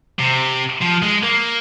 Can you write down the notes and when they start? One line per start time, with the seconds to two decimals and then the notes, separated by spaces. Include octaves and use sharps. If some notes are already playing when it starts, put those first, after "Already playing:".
0.19 C3
0.82 F3
1.02 G#3
1.23 A#3